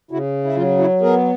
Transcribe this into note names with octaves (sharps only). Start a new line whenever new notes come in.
C#3 E4 F#4
E4
F#3 F4
E4 F#4
B3 G#4 A#4